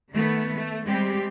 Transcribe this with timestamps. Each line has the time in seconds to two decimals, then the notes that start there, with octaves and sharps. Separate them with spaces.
0.12 D#3 A3 B3
0.57 A3
0.86 G3 G#3 C4 G4